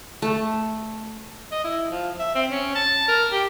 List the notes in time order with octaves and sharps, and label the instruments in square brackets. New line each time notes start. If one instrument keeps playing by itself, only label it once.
[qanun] A3
[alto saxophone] D#5
E4
F3
E5
C4
C#4
A5
A#4
G4